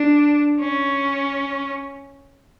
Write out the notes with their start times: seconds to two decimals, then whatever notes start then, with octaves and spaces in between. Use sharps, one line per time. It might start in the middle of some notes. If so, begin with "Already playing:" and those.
Already playing: D4
0.61 C#4